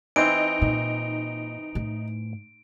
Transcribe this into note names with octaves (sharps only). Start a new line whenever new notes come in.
E3 C4 D#4 D7
A#2
A2